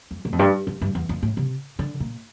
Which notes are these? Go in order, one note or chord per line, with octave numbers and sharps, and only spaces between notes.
F2
A2
F2
G2
F2
G2
E2
F2
A2
C3
D3
A#2